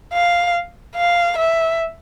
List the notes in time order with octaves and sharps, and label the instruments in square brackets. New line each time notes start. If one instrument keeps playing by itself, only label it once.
[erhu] F5
F5
E5